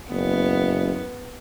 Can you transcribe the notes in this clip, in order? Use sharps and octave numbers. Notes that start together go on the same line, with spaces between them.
F#1 B3